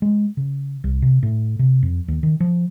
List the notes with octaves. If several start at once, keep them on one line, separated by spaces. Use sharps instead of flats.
G#3
C#3
C2
C3
A2
C3
F2
D#2
D#3
F3